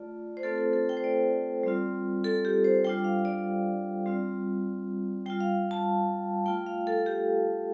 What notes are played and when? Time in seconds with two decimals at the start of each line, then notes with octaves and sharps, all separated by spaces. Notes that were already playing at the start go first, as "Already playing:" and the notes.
Already playing: A3 F4 D5
0.37 C5
0.43 A3 C4 F4 A4
0.58 A4
0.73 A4
0.89 G5
0.97 C5
1.04 D5
1.63 G3 C4 F4
2.24 A4
2.45 G4
2.64 C5
2.85 G3 D4 F4 G5
3.04 F5
3.25 D5
4.06 G3 C4 F4
5.26 G3 F4 G5
5.41 F5
5.71 A5
6.46 A3 F4 G5
6.66 F5
6.87 A4
7.06 G4